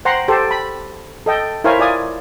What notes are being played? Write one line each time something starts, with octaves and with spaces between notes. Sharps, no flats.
C5 F#5 G5 A#5 C6
G4 A4 C5
B5
A4 D#5 G5
E4 A#4 C5 C#5 F5 G#5
F4 D5 G#5 D#6